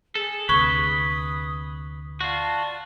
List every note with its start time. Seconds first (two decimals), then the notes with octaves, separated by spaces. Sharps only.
0.15 G#4 A4
0.49 D2 C3 B4 C#6 D#6 G#6 G7
2.21 F4 F#4 D5 A5